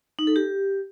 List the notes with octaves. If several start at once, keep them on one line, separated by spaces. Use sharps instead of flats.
D#4
A4
G4